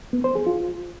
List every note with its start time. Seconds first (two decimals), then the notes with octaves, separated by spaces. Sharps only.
0.13 B3
0.24 C5
0.35 G#4
0.47 F4